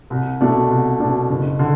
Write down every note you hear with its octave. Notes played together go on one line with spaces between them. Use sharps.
C2
B2 A3 D4
C2
B2 A3 D4
F#1
D3